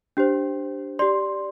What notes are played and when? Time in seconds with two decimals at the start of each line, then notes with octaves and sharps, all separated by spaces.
0.17 D4 G4 C5
0.99 G4 D5 C6